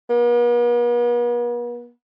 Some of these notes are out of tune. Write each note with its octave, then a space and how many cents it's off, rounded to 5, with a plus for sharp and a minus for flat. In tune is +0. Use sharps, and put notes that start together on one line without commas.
B3 -45